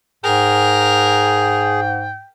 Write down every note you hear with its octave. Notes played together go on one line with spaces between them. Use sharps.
G#2 G#4 A#4 G5